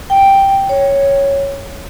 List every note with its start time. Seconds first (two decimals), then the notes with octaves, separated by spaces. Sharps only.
0.10 G5
0.69 C#5